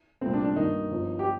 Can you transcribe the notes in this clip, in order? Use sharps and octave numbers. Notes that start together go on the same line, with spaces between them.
C2 A#2 A3 C4
D4
D4
G2 D#3 A#3 D#4
G1 G2 F3
G4